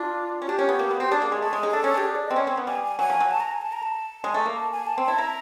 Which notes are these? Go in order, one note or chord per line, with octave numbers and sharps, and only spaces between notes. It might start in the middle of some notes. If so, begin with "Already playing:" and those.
Already playing: D4 F4
C#4
D4 G4
C#4
B3
A#3
B3
C4 G4
D4 G#4
A#3
G#3
A3 G#4
G#3
D#4
G#4
D4 A4
C#4
D4 G4
G#4
D5
C4 D#5
C#4
C4
B3
G3 G#5
G#5
F#3 G#5
F3
F#3
A5
A#5
G#5
A5
A#5
A5
G#3 G#5
A3
A#5
A#3
A5
G#5
A5
C4
E4 A5
E4 A#5